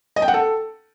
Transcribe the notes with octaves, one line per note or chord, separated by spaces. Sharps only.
D#5
G5
F#5
A4